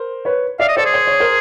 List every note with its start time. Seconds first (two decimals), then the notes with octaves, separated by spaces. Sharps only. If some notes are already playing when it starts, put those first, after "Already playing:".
Already playing: A#4 C5
0.25 B4 C#5
0.59 D5 E5 F5
0.68 D#5
0.77 A4 C5 D5
0.85 G#4
0.94 C5
1.07 C#5
1.20 A#4 C5